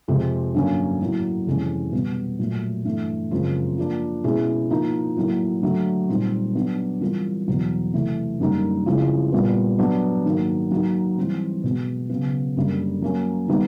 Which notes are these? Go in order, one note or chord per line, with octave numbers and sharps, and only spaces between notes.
F2 C3 F3 G#3 C4
G2 D3 F#3 A#3 C#4
A2 F#3 A#3
F2 C3 E3 G#3 C#4
B2 G3 B3
A#2 F#3 A3
G2 E3 A3
F#2 C#3 F3 G#3 C4
F3 A#3 D4
B2 G#3 C#4 E4 G#4
F3 A#3 D#4
A2 F#3 A#3
D3 F#3 A3
A#2 G3 C4 D#4
F#3 B3 D4
E3 G3 C4 F4 A#4
E2 B2 F#3
C3 E3 A3
F#2 D3 G3 A#3 D#4
C#3 F3 G#3 C4 E4
A#2 G3 B3
F#3 B3 D4
G#2 D#3 F#3 A#3
F#3 A#3 D#4
E3 G3 C4
B2 G#3 B3
C#3 F#3 B3
F#2 D3 G3 A#3
F#3 A#3 C#4
D#3 G3 B3 D#4